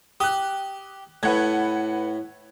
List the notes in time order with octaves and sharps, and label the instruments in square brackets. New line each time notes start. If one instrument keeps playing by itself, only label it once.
[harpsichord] G4 [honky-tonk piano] D#6 F#6
[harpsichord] A2 [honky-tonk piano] B4 F#5 G#6